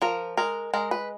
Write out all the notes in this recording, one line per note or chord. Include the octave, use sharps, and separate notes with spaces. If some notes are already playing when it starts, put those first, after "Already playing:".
F3 A#4
G#3 A#4
G#3 A#4
B4